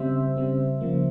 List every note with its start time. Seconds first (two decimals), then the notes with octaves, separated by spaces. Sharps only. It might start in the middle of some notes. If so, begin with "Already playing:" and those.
Already playing: C#3 G3 C4 C5 E5
0.37 C#3 G3 C4
0.81 C#3 F3 A#3